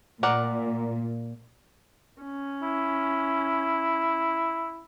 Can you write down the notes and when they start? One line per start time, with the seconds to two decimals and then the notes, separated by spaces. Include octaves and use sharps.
0.23 A#2 A#4 D5 F#5
2.22 C#4
2.62 E4